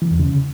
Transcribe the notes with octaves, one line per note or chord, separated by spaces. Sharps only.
E3
E2
C#3